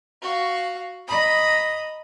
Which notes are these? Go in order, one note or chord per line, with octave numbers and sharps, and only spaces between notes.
F#4 F5
D#5 A#5 B5 D#6